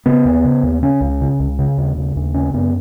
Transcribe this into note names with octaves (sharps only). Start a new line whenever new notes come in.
C#3 B3
D#2
C#3
D#2
C#3 C#4
C#2
C#3
C#2
C#3
D#2
C#3
D#2
C#3 C#4
F#2 B3